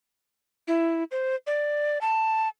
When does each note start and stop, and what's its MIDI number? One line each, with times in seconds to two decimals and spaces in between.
0.68 1.04 64
1.11 1.35 72
1.47 1.99 74
2.01 2.48 81